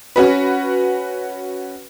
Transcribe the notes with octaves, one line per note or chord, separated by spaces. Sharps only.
C#4 F#4 B4